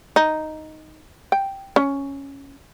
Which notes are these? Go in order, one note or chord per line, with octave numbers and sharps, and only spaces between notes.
D#4
G5
C#4